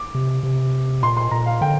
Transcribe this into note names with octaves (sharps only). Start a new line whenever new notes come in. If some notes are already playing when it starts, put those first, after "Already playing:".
Already playing: D6
C3
C3
A#2 C6
C6
A#2 A#5
F5
D3 G5